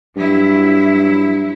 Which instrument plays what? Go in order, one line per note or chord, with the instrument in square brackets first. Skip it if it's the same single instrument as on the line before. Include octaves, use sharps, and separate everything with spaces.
[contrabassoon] G2 [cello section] F#3 E4